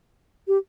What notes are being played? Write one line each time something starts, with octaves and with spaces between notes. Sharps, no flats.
G4